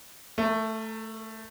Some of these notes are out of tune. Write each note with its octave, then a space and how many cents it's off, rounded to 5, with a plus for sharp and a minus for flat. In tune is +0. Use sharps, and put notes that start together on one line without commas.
A3 +5 A#4 -30